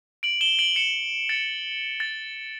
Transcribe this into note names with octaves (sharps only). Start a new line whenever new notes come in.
D7 F#7
E7 G7
D7 F#7
C#7 E7
A6 C#7
A6